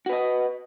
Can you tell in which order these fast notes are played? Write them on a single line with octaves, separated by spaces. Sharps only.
F#4 B4 D#5